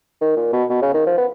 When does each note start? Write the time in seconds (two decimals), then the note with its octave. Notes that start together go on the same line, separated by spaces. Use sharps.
0.21 D#3
0.37 A#2
0.53 B2
0.70 B2
0.82 C#3
0.94 D#3
1.06 F3
1.18 B3